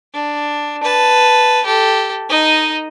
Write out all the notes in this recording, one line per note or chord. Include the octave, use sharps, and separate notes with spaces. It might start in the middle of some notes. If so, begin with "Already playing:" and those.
D4
B4 A5
G4 A4
D#4 D#5